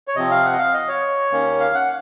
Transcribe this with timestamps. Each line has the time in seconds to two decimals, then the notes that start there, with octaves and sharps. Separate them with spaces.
0.08 C#5
0.16 C3 F3 C4 D#5
0.31 F5
0.45 F#5
0.53 D#5
0.59 F5
0.74 D#5
0.88 C#5
1.31 D#2 D#3 A#3 C#4
1.60 F5
1.74 F#5